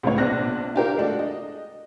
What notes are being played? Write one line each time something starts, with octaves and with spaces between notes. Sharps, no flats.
C#2 A2 B3 C4 C#5
A#1 B2 D4 C5 F#6 A#6
E4 F4 G4 A#4
G#3 A3 D4 F#4
D#5